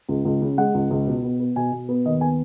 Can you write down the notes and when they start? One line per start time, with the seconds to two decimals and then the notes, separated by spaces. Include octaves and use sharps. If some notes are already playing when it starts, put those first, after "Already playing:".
0.09 C#2
0.25 C#2
0.42 C#3
0.58 G#3 F#5
0.74 C#2
0.90 C#2
1.07 B2
1.23 B3
1.40 B3
1.56 B2 G#5
1.72 B2
1.89 B3
2.05 D#2 D#5
2.21 B3 G#5